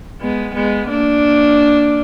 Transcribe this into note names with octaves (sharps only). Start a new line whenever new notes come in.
G#3 B3
G#3 B3
A#3 D4